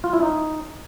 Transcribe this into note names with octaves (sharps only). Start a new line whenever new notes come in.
F4
E4
D#4